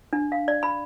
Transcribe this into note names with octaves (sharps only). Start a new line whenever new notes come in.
D4
F5
D5
B5